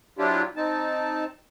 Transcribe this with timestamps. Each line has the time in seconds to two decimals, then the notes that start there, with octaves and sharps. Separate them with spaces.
0.18 F3 F#3 D4 E4 F4 G4
0.56 C4 D#4 A5